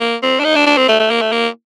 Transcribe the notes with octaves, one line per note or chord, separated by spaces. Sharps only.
A#3
C4
D4
D#4
D4
D4
C4
A3
A3
A#3
A3
A#3